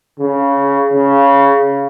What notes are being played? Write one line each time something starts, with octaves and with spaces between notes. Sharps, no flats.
C#3
C#3